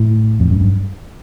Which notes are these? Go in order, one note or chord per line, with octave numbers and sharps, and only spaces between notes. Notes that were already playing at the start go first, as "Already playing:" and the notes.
Already playing: A2
F2
F#2
G2